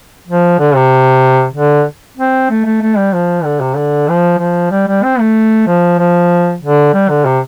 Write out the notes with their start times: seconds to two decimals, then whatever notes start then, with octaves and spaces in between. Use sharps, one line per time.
0.28 F3
0.59 D3
0.76 C3
1.54 D3
2.17 C4
2.50 A3
2.65 A3
2.82 A3
2.98 G3
3.13 F3
3.44 D3
3.61 C3
3.77 D3
4.08 F3
4.39 F3
4.71 G3
4.87 G3
5.03 C4
5.19 A3
5.67 F3
5.99 F3
6.61 D3
6.93 G3
7.09 D3
7.25 C3